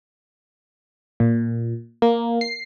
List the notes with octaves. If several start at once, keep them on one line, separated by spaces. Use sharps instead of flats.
A#2
A#3
C7